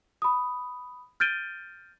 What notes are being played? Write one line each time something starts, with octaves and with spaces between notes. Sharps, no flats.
B5 D#6
F6 G6 A6 D7 D#7 G7